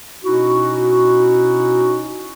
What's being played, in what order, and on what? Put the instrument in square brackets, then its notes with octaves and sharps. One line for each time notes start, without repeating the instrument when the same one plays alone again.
[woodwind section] B2 C#4 D#4 E4 F#4